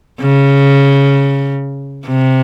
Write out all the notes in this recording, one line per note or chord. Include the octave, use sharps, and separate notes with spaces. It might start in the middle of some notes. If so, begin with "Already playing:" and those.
C#3
C3